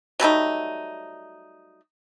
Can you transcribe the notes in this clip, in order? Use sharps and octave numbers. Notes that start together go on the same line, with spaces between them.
F#3 G3 A3 D#4